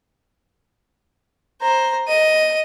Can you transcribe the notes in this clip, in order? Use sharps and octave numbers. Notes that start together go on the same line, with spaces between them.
C5 A#5
D#5 D#7